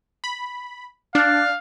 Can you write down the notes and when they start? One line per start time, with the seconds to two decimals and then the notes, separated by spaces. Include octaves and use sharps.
0.24 B5
1.15 D4 F5 D6 F#6 A6